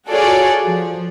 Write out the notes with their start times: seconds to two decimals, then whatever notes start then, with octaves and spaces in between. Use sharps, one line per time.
0.10 F4 F#4 G#4 A4 C#5 D5
0.65 F3